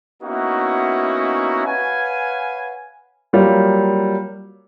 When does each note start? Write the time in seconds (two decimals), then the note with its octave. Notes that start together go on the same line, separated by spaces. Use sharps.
0.23 A#3 B3 C#4 D#4 E4 F#4
1.66 B4 C#5 F5 F#5 G#5
3.33 F#3 G3 A#3 F4